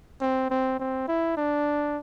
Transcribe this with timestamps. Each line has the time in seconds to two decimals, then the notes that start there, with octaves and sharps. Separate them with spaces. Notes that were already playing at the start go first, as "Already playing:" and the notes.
0.21 C4
0.50 C4
0.80 C4
1.08 E4
1.37 D4